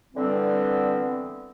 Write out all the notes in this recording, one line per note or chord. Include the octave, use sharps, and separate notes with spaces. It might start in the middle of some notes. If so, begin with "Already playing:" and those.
D3 E3 G3 B3 C4